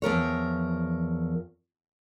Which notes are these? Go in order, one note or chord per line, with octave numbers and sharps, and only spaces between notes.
E2 F3 A#4 C#5